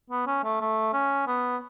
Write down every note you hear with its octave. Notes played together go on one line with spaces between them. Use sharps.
B3
C#4
A3
A3
C#4
B3